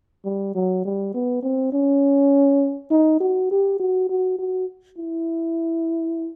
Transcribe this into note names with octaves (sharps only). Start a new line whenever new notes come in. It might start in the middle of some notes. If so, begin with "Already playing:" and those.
G3
F#3
G3
B3
C4
C#4
D#4
F#4
G4
F#4
F#4
F#4
E4